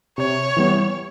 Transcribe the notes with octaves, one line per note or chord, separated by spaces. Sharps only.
C3 C#5
E3 G3 B3